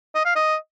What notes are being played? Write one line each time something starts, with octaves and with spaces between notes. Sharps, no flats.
D#5
F5
D#5